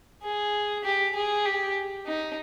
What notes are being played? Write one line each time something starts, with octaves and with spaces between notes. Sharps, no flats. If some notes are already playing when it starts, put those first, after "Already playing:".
G#4
G4
G#4
G4
D#4